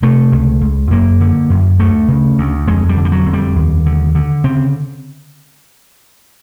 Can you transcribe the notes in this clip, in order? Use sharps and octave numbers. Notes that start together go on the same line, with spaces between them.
C3 A3
C#2
C#2
F#2 A#3
D3
F#2
D2 A3
C#3
D2
F2 G#3
G3
D3
G3
F#3
F2
G3
D#2
D3
D3
C#3 C4